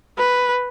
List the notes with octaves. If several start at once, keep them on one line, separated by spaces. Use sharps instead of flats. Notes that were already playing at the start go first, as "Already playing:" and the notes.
B4